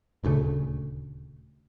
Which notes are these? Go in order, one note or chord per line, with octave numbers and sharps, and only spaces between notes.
D#1 D2 C#3 A3